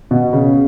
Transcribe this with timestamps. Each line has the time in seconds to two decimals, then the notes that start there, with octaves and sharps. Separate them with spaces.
0.11 B2
0.33 C#3